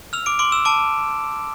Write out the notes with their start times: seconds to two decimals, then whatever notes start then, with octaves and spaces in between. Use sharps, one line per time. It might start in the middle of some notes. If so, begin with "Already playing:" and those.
0.13 E6 F6 F7
0.26 D6 D7
0.39 C6 D6 D7
0.52 E6 E7
0.65 A5 D6 D7